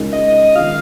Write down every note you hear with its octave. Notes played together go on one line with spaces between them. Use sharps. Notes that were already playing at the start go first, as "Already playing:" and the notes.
Already playing: C#2 C#3 G#3 D#4 A#4
D#5
D#3 G#3 F4 F5